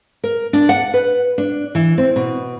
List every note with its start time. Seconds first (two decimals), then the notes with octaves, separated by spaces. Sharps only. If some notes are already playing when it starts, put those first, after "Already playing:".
0.24 A#4
0.53 D4
0.69 F#5
0.94 B4
1.38 D4
1.75 E3
1.98 C4
2.16 B2